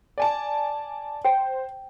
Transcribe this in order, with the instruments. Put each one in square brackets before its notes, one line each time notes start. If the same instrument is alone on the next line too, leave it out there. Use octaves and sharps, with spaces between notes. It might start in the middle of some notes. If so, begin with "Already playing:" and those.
[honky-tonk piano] D5 G#5 A5
[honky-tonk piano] C5 [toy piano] G5